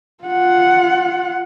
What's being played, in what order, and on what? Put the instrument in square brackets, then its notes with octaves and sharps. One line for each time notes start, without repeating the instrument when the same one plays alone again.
[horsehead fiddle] F4 F#5